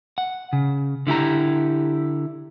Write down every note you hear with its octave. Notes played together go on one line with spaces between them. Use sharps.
F#5
C#3
D3 E4 G4 A#5